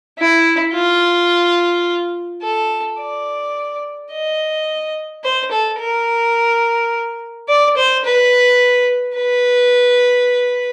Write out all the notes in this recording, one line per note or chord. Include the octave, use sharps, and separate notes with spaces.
E4
F4
A4
D5
D#5
C5
A4
A#4
D5
C5
B4
B4